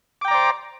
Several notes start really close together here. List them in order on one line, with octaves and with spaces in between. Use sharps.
D6 G5 A#5 D5 C5